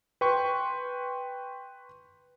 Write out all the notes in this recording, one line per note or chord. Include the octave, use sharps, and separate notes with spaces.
B4 G5 C6 C#6